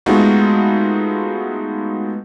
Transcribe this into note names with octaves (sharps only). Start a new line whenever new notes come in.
G#3 A3 B3 D#4 F4 F#4